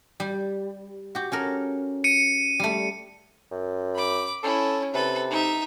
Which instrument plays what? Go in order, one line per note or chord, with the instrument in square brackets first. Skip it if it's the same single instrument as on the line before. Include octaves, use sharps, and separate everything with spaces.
[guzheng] G3
F#4 G4
C#4 A4 A#4
[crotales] C#7 D#7
[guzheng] G3 A3
[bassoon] F#2
[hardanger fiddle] B5 D6
[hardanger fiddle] C#4 E4 [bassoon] A4
[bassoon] C3 [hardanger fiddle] A4 B4
[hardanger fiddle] D#4 E5